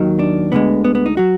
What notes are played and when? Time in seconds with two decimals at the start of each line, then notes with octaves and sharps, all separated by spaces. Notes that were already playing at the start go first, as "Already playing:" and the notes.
Already playing: D#2 D#3 F#3
0.19 D4
0.52 D2 D3 G#3 B3
0.84 B3
0.95 B3
1.06 D#4
1.17 F#3 F#4